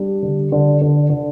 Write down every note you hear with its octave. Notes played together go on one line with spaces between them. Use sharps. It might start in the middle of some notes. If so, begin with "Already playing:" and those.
Already playing: G3 D4
D3
D3
D3
D3